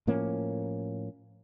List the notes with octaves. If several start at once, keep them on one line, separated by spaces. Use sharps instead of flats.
A2 F3 A#3 C#4